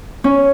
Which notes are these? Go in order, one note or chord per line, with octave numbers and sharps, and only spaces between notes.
C#4